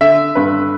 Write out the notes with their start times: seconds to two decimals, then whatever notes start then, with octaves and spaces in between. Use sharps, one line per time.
0.01 D3 E5
0.35 G2 B4